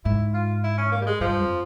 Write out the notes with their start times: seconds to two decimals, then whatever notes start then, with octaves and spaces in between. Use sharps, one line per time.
0.05 G#2 E4
0.34 F4
0.63 E4
0.78 C#4
0.91 A#3
1.01 G3
1.06 G#3
1.20 G2 F3
1.40 F2